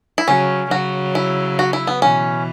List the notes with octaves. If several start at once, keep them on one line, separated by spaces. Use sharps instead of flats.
E4
C#3 F#3 C#4
C#3 F#3 F#4
E4
F#4
E4
B3
B2 E3 C#4